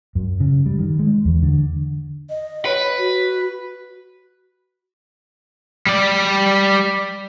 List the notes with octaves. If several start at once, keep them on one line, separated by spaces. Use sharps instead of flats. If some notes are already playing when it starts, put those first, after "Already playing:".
F#2
C#3
G3
D#3
G#3
E2
D3
D#5
B4 C#5
F#4
G3 D5